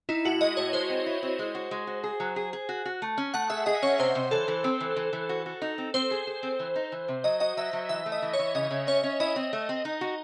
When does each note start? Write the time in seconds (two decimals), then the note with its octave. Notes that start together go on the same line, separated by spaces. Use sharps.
0.09 D#4 E4
0.25 A2 F#4
0.41 G#3 D#5
0.57 A2 C#5
0.73 G#3 C5
0.89 C4
1.06 E4
1.23 C4
1.39 G#3
1.55 F#4
1.71 G#3
1.87 F#4
2.04 G#4
2.20 F#3
2.36 G#4
2.53 G#4
2.69 F#4
2.85 F#4
3.02 A3
3.18 C#4
3.34 A3 F#5
3.50 G#4 E5
3.66 G#4 D#5
3.82 C#4 C#5
3.99 C3 C5
4.15 C3
4.31 E3 A4
4.48 E3
4.64 C4
4.80 E3
4.96 E3
5.13 E3
5.29 F#4
5.46 F#4
5.62 D#4
5.78 C4
5.94 C4 C5
6.11 G#4
6.27 G#4
6.43 C4
6.59 E3
6.76 D#4
6.92 E3
7.08 C3
7.24 F#3 D#5
7.40 F#4 D#5
7.57 F#3 E5
7.73 F#3
7.89 E3 E5
8.06 A3
8.12 D#5
8.22 E3
8.33 C#5
8.39 E3
8.55 C#3 D#5
8.71 C#3
8.87 C#4 C#5
9.04 C#4
9.20 E4 D#5
9.36 C4
9.53 A3
9.69 C4
9.85 D#4
10.01 F#4